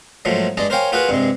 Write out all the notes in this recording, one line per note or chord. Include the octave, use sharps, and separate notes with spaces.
G#2 F3 F#3 A3 A#3
G2 G#3 D5 D#5 A5
A#4 C5 C#5 F5 G5 G#5
F4 F#4 G#4 A#4 B4 F#5
G2 C3 G#3